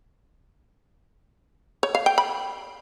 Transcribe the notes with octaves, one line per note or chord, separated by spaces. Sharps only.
C#5
F5
G5
B5